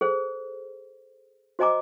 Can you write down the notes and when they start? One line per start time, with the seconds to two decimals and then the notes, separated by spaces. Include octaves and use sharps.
0.01 G#4 A4 C5
1.59 F#4 C5 D#5 G#5 A#5 D6